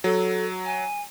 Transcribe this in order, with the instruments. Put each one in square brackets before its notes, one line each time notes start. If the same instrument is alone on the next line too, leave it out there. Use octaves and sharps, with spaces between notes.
[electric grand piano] F#3 [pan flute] A4
[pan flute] G#5